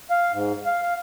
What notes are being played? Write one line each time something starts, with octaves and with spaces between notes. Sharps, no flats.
F5
G#2
F5
F5